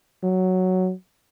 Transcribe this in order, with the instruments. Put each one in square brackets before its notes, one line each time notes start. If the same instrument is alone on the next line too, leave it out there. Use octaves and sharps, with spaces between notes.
[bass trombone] F#3